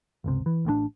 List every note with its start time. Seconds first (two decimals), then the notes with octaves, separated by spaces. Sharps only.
0.24 G1 C#2 C3
0.46 E3
0.65 A1 A2 C3 D4